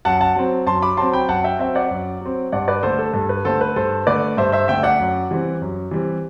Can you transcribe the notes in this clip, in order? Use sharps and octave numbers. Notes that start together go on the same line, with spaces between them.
F#2 F#5 A5
F#5 A5
F#3 C4
F#2 A5 C6
B5 D6
F#3 C4 A5 C6
G5 B5
F#2 F#5 A5
E5 G5
F#3 C4 E5 G5
D5 F#5
F#2
F#3 C4
G2 D5 F#5
B4 D5
D3 A3 A4 C5
A4
G2 A4
B4
D3 A3 A4 C5
B4
G2 A4 C5
D3 A3 B4 D5
G2 C5 E5
C5 E5
D3 A3 E5 G5
D5 F#5
F#2
E3 G3 C4
F#2
E3 G3 C4